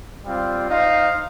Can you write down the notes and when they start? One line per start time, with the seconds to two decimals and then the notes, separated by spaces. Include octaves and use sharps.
0.24 G3 C4 F4
0.69 D#4 C5 F5